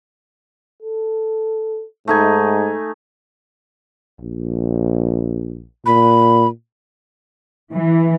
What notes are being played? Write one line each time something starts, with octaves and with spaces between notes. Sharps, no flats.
A4
G#2 A3 D#4 G#5
A#1
A#2 B5
E3